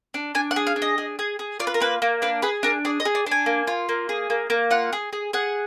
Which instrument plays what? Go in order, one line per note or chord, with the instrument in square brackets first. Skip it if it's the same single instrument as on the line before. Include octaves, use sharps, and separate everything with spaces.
[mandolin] D4
D4 G#5
F#5
G#4
F5
D4
D#5
G#4
G#4
G#4
F4 D5
B4
A#4
A#3 B4
A#3
D4 B4
G#4 B4
D4 A#4
G#4 D5
D#5
G#4
D5
D4 G#5
A#3
F4
A#3
G#4
A#3
A#3
F4 F#5
G#4
G#4
G#4 F#5